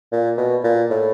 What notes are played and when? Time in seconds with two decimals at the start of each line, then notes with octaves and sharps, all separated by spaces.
0.12 A#2
0.38 B2
0.64 A#2
0.90 A2